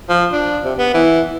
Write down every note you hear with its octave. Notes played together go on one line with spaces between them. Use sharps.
F3
D4
C3
B3
E3